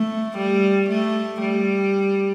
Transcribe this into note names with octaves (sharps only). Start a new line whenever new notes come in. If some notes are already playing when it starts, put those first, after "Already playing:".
Already playing: A3
G3
A3
G3